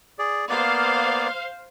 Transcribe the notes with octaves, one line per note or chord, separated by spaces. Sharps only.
G#4 D5
A#3 B3 C5 D5 F5